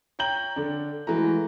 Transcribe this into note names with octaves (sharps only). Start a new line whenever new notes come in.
C#5 G5 A#5 G6 F#7
D3 D4
E3 G#3 A3 F#4 A#5